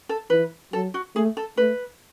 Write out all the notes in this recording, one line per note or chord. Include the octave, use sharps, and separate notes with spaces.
A4
E3 B4
F#3 A4
F#4
A3 G#4
A4
A3 B4